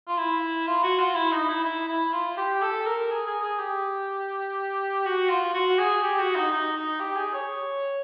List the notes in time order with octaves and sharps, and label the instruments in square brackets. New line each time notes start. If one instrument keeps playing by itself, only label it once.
[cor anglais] F4
E4
F4
F#4
F4
E4
D#4
E4
E4
E4
F4
G4
A4
A#4
G#4
G#4
G#4
G4
F#4
F4
F#4
G#4
G4
F#4
D#4
D#4
D#4
G4
G#4
C#5